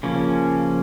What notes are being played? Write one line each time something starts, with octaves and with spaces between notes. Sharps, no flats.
C#3 F3 A#3 C#4